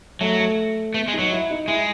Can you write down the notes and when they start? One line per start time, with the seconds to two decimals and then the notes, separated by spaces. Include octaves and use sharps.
0.21 F#3 A3
0.40 A3
0.94 A3 B3
1.08 G#3
1.13 D#4
1.19 F#3
1.32 E4
1.51 D#4
1.68 G#3 E4